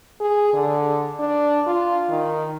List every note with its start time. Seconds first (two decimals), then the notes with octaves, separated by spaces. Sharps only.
0.20 G#4
0.54 D3
1.20 D4
1.67 F4
2.09 D#3